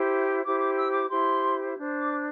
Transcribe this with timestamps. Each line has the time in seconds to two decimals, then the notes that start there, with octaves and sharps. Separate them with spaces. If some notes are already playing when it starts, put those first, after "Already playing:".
Already playing: E4 G4 C5
0.44 E4 G4 C5 D6
0.60 D6
0.76 E6
0.93 D6
1.09 E4 G4 C5 C6
1.77 D4 C5
1.99 D6